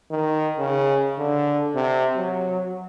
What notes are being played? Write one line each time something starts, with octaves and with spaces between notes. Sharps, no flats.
D#3
C#3
D3
C3
F#3